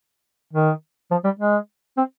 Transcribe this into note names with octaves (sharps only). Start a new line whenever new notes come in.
D#3
F3
G3
G#3
C4